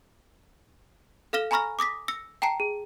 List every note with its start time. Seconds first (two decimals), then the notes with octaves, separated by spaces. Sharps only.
1.33 A4 F5 F6 A#6 E7 G7
1.51 G#5 A#5 B5 C#6 F6 A#6
1.79 D6 D#6 A#6 B6
2.08 E6 A#6 C#7
2.42 G5 A5 A#5 C7 C#7
2.60 G#4